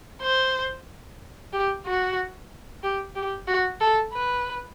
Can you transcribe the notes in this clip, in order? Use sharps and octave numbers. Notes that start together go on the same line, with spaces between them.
C5
G4
F#4
G4
G4
F#4
A4
B4